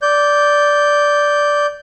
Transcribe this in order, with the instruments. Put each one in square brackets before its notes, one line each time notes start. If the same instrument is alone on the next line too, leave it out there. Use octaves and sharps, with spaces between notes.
[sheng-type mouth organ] D5 G6